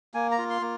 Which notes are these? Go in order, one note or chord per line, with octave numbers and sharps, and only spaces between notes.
A#3 G#5
A#5
F4
C6
A#3